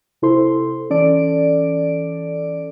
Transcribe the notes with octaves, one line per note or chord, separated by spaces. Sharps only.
C3 E4 A4 C5 C6
E3 C#4 A4 D5 D7